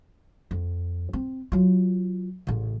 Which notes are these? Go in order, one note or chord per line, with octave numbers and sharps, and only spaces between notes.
F2
C4
F#3 F4
A1 C#3